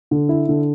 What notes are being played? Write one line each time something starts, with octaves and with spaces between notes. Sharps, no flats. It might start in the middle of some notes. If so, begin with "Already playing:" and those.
D3
E4
D3